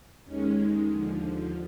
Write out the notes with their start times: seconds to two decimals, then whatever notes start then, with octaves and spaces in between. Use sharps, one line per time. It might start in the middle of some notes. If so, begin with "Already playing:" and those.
0.24 D#2 D#3 G#3 C#4
0.87 D#2 D3 F3